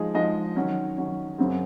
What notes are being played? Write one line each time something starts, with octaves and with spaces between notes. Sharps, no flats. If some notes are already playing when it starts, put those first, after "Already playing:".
Already playing: F3 G#3 D#4 G#4
F3 G#3 D#4 G#4 D#5
D#3 F#3 C#4
D#3 F#3 C#4
F#2 C#3 F#3 C4